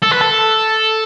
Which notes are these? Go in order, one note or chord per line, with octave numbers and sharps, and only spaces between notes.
A4
B4
A4